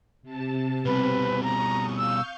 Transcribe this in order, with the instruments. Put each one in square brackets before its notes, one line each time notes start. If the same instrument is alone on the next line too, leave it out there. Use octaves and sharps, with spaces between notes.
[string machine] C3 A5
[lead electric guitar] B2 G3 [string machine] C4 [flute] B4
[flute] A#5 [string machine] C#6 D#6
[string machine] F5 C#6 G6 [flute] E6